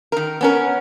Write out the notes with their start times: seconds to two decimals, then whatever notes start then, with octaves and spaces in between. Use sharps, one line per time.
0.12 D#3 A#4
0.41 B3 C#4 A#4